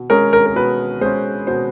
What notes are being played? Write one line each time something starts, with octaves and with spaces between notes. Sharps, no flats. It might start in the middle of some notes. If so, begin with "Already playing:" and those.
Already playing: B2
G#3 C#4 A#4
A#4
A#4
B2 B4
G#3 C#4 C5
B2 C5